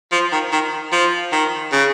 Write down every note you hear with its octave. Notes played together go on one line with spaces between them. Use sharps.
F3
D#3
D#3
F3
D#3
C#3